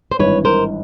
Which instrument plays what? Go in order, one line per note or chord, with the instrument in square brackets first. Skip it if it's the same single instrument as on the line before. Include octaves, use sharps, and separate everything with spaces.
[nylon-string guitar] C5
[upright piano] G#1 G2 E3 [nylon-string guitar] B4 C#5
[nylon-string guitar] A#4 C5